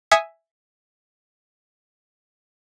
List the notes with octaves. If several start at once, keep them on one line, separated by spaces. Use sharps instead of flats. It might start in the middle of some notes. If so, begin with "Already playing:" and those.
E5 G#5 D#6 C#7